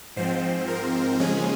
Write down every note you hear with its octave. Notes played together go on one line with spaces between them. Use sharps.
G#2 F3 C4 C5
A#4
D#2 C#3 F3 G#3 C#4 G#4